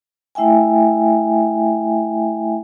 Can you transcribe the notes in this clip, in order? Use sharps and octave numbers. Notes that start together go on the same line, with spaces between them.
A3 E4 E5 G5 G#5